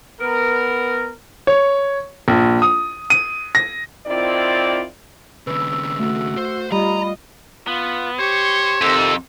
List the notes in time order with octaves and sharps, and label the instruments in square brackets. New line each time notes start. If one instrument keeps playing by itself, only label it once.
[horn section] B3 A#4
[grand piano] C#5
A#1
D#6
D#7
A#6
[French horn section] D#3 C4 E4 F4 D5
[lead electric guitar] D#2 C#3 [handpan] B4 [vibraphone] E6
[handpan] A3 [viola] F#4
[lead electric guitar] C5
[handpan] G3 [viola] F4 D#5 [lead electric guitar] A#5 [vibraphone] B5
[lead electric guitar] B3 [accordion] F4
[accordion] G4 C#6 [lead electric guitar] C5 [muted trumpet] C#5
[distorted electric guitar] F2 [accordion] C3 D#3 A4